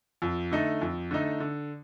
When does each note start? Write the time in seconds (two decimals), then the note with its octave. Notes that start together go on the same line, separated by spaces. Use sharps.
0.22 F2
0.51 D3 A3 D#4
0.81 F2
1.11 D3 A3 D#4
1.40 D3